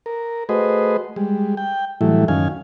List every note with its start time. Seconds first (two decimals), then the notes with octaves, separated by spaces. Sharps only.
0.06 A#4
0.49 A3 F#4 G#4 B4 C5 D#5
1.16 G3 G#3
1.57 G5
2.01 A2 E3 F#3 G3 A3 E4
2.28 F#2 D#3 C#4 F5 G#5